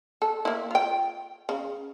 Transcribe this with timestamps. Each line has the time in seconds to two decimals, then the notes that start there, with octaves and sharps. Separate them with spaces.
0.22 A4
0.45 A#3 E4
0.71 F4 G5
1.49 C#3